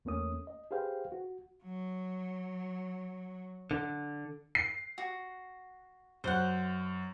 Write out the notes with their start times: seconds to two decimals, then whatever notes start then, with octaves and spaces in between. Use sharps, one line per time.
0.05 E2 A3 A#3 C#4 D#6
0.47 D#5
0.71 G4 G#4 B4 C5 F5 G5
1.12 F#4
1.63 F#3
3.71 D3
4.55 C7
4.98 F#4
6.24 F#2 C5 F#5